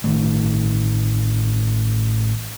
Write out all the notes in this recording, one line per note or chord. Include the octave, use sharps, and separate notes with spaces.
A1 D#3 A3